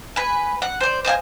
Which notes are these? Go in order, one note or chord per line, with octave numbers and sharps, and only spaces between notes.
B4 G#5
F#5
C5 D5
C5 D#5 F5 G#5